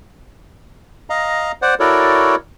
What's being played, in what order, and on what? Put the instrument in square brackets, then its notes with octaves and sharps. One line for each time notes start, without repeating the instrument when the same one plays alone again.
[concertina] D#5 F5 A#5
C5 D5 F#5
E4 F#4 A4 A#4 C#5 D5